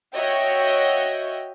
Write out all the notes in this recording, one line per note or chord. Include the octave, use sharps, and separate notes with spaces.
F#4 C#5 D#5 E5 G5